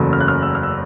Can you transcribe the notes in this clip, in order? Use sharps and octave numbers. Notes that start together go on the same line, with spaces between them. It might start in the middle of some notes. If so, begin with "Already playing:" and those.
Already playing: F#1 E2 C#3 F#3 A3
F6
F#6
F6
E6
F6
E6